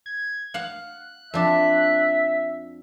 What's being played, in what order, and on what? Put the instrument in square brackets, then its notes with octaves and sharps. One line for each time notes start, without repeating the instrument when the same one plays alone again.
[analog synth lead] G#6
[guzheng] F5 F#5 [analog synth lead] F#6
[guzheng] F2 D4 [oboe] E5